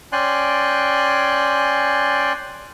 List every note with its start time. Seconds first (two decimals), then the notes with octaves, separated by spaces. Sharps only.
0.12 C#4 D5 G5 G#5 C6 F#6